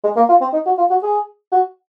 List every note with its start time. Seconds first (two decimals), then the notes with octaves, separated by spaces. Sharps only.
0.04 G#3
0.16 A#3
0.29 F4
0.41 C4
0.53 D#4
0.66 F#4
0.78 F4
0.90 F#4
1.03 G#4
1.52 F#4